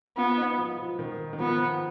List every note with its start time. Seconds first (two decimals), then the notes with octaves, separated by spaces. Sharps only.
0.17 B3 F4
0.38 D#4
0.58 F3
0.78 F3
0.99 D#3
1.33 D#3
1.39 F3 B3